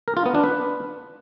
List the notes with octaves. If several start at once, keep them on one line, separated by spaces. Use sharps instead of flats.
A#4
F4
B3
D4
B4